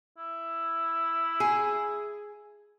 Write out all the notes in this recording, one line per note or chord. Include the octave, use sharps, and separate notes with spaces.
E4
G#4